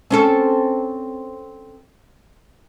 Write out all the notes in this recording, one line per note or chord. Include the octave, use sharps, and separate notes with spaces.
C4 C#4 A4